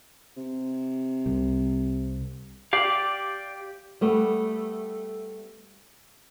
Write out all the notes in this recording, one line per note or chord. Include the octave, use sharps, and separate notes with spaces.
C3
C2
G4 D5 F5
G3 A3 B3